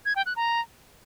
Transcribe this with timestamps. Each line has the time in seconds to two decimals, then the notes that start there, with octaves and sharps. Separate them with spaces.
0.05 G#6
0.16 G5
0.26 F#6
0.36 A#5